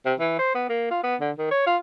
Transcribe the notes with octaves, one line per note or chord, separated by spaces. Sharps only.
C3
E3
C5
B3
A#3
F4
B3
D3
D#3
C#5
F4